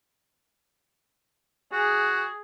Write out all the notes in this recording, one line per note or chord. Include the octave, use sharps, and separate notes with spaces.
F#4 G#4